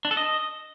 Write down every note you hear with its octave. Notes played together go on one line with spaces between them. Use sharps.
D4
A4
D#5